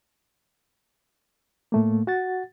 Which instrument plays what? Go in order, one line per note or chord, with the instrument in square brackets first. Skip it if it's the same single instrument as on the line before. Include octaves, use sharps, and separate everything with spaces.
[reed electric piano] A2 A3 A#3
F#4 F#5 A6